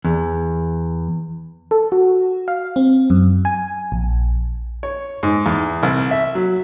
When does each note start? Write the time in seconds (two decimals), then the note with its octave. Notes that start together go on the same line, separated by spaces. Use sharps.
0.05 E2
1.71 A4
1.92 F#4
2.48 F5
2.76 C4
3.10 F#2
3.45 G#5
3.92 A#1
4.83 C#5
5.23 G#2
5.46 E2
5.83 C2
6.11 E5
6.35 F#3